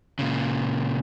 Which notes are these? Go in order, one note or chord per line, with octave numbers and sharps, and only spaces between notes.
A#2 C#3